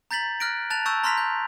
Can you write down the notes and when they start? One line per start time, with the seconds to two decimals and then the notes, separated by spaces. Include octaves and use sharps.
0.11 A#5 G6 A6 B6 F#7
0.40 F6 F#6 A#6 D7
0.70 A5 F#6 A6 F7
0.86 A5 C#6 E6 G6
1.04 A#5 C6 F6 A#6 B6 F7
1.17 G6